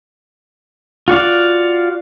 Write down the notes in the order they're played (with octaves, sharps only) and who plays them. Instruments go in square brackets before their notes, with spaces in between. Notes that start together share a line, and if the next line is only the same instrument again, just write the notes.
[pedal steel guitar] F4 F#4 D5 F5